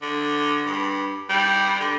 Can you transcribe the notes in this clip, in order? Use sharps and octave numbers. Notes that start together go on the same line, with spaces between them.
D3
G2
G3
D3